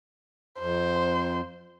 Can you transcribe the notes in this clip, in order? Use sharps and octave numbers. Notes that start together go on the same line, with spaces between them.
F2 C5